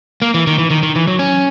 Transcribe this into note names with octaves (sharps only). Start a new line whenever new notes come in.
A#3
E3
D#3
E3
D#3
D#3
E3
F#3
C#4